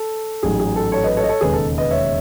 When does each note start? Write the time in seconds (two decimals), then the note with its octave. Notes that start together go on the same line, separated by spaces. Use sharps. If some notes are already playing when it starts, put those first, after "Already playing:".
Already playing: A4
0.43 A1 G#2 F#3 G#4
0.59 G#4
0.76 A4
0.92 A4 C#5
1.04 B4 D#5
1.17 A4 C#5
1.23 D#5
1.29 A4 C#5
1.41 E1 D#2 C#3 G#3 G#4 B4
1.53 A4
1.78 B4 D#5
1.90 C#5 E5